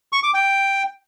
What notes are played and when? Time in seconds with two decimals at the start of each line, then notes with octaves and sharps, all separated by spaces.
0.13 C#6
0.23 D6
0.34 G5